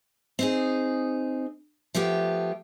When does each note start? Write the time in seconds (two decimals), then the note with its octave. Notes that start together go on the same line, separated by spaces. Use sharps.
0.39 C4 D#4 G#4
1.94 F3 A3 B3 G4